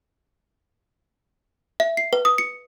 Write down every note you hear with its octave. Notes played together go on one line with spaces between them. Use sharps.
E5
C7
B4
D#6
C#7